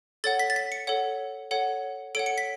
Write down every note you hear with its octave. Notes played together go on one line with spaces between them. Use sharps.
A4 C#5 F#5 A6
B6
A6
B6
C#7
A4 C#5 F#5
A4 C#5 F#5
A4 C#5 F#5 D7
C#7
B6